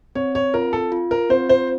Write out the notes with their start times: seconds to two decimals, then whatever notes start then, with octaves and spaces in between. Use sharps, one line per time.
0.15 C4 C#5
0.35 C#5
0.54 F4 A#4
0.73 A4
0.92 F4
1.11 A#4
1.30 C4 C5
1.49 C5